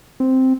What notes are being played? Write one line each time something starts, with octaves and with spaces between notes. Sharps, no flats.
C4